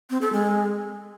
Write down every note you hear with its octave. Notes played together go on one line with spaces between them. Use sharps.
C4
A4
G#3